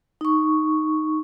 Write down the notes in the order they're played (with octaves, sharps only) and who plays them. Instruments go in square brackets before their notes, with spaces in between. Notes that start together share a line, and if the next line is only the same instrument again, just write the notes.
[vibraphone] D#4 C#6